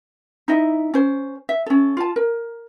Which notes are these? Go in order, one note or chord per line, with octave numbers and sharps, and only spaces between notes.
D#4 E4 D#5 E5
C#4 C5
E5
C#4 A4
F4 A5
A#4